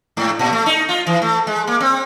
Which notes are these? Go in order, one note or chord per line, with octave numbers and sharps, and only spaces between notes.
G#2
A#2
A3
D#4
F4
E3
A3
G#3
A#3
C4